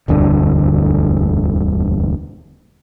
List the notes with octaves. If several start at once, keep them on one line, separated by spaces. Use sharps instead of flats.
E1 D2 G2 D3